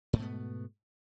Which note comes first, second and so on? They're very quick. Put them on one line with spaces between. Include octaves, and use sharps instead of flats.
G#2 A3 B2 B3